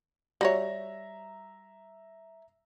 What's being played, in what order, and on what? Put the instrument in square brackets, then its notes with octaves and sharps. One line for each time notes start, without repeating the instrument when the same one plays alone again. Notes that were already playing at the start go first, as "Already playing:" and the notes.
[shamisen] G3 F#4 C#5 [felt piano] E5 A#5 A#6